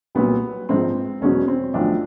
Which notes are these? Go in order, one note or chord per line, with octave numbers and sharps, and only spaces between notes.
C2 A#2 F#3 B3
A#1 G#2 F3 C4
E1 E2 B2 F#3 C#4
C4
B1 A2 F3 D4